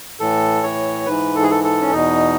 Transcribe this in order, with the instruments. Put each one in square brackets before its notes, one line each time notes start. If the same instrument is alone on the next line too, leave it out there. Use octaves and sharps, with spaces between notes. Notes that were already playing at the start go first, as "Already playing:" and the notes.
[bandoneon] A2 E3 A4
C#5
G#2 E3 B4
A4
G#4
A4
A4
C#4
E2 B2 D#4